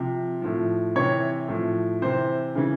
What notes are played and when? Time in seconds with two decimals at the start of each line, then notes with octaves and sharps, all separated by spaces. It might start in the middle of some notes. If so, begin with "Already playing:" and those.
Already playing: C3 F3
0.42 A2 F3
0.96 C3 E3 C#5
1.48 A2 F3
2.02 C3 E3 C5
2.55 C#3 E3